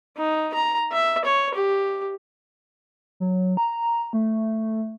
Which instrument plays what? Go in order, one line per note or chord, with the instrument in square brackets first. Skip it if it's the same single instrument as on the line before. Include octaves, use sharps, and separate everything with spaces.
[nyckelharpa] D#4
A#5
E5
C#5
G4
[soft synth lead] F#3
A#5
A3